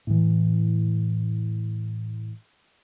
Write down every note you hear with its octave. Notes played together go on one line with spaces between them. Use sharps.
A2 E3